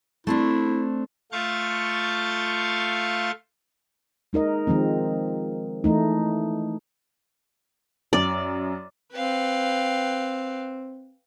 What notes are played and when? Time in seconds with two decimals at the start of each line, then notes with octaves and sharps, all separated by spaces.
0.27 A3 C4 D4 E4
1.32 A3 F4 F5 C#6 G6 A6
4.33 G#3 D#4 A#4 D#5
4.67 D#3 F3 G#3 C4
5.84 E3 A3 D#4
8.13 F#2 D5
9.14 C4 B4 F5 G5